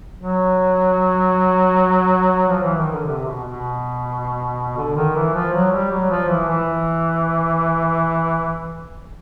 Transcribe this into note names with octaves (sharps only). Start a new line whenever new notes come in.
F#3
F3
E3
D#3
D3
C3
B2
B2
D3
D#3
E3
F3
F#3
G3
F#3
F3
E3
E3